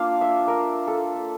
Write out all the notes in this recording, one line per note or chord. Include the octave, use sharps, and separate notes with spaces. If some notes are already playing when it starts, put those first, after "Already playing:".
Already playing: A#3 D4 F4 F5
E5
A#4
A4